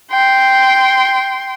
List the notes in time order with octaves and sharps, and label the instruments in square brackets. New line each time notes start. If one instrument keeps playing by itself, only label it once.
[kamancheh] G5 C6